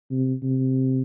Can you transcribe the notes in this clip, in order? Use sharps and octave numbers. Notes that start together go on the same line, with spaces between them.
C3
C3